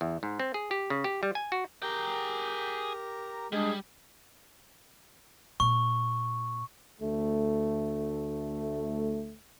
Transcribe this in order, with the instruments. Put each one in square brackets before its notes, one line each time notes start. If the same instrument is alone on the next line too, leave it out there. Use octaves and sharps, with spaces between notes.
[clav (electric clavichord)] E2
G#2
C4
G#4
G4
C#3
G4
G3
G#5
F#4
[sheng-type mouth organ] G4 A#4 A#5 [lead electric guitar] G#4 G5
[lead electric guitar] G3 [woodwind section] G#3 D4 G#4
[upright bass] A#2 [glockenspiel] C#6
[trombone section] D2 A3